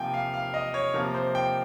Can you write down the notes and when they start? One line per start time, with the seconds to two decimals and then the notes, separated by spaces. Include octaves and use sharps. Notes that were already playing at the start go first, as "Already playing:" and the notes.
Already playing: C3 F3 A#3 G5 G#5
0.14 F5
0.34 F5
0.54 D#5
0.74 C#5
0.94 C3 F3 A#3 A#4
1.14 C5
1.35 G5